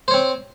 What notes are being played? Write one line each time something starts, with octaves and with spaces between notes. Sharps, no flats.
C4 C5 C#5